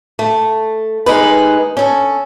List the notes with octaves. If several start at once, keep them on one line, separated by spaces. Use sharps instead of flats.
A3
D#2 G#3 D#4 B4
C#4 A4